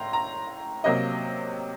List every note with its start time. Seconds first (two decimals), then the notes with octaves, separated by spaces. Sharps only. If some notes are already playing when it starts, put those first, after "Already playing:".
Already playing: A2 A#5 C6
0.13 A#5
0.84 C3 F#3 A#3 D#5